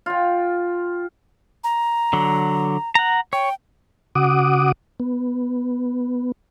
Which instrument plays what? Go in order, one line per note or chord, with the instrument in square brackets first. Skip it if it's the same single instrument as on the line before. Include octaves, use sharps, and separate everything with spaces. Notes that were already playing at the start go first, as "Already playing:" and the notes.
[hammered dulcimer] F4 G5
[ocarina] A#5
[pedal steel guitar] D3 F#3
F#5 A#5
[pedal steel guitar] C#5 [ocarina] G5
[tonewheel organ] C#3 F#4 F#5 D6 D#6
B3